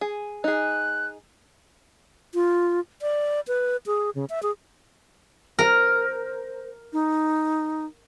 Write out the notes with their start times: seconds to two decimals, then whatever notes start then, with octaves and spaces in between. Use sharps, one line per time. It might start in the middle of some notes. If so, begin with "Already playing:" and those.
0.01 G#4
0.44 D#4 G#4 F#6
2.34 F4
3.02 D5
3.48 B4
3.86 G#4
4.15 C#3
4.30 E5
4.43 G#4
5.59 A#4 C5
6.93 D#4